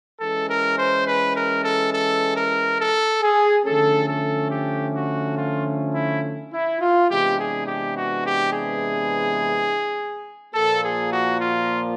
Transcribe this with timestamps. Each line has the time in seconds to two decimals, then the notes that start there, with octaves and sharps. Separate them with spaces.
0.20 E3 G#3 C#4 A4
0.49 A#4
0.78 C5
1.06 B4
1.35 A#4
1.63 A4
1.93 A4
2.36 A#4
2.79 A4
3.21 G#4
3.64 D3 F3 A3 C#4 A4
4.07 A4
4.50 G4
4.94 F#4
5.37 F4
5.94 E4
6.52 E4
6.80 F4
7.09 C3 E3 G#3 B3 D4 G4
7.38 G#4
7.66 G4
7.95 F#4
8.24 G4
8.52 G#4
10.54 A#2 F3 A#3 A4
10.83 G#4
11.11 F#4
11.40 F4